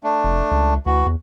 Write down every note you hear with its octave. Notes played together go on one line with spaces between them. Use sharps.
A3 D4
F1
C#2
D2 E3 F#4
E2